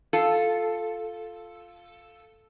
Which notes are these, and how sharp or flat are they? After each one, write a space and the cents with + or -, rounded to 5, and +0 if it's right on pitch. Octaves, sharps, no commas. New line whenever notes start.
F4 +0 A4 +0